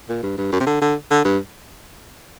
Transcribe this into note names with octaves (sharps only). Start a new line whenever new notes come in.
A#2
G2
G2
F#2
C3
D3
D3
D3
G2